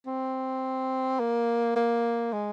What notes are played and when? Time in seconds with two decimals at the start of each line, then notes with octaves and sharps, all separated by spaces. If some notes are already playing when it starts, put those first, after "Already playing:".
0.07 C4
1.20 A#3
1.76 A#3
2.33 G#3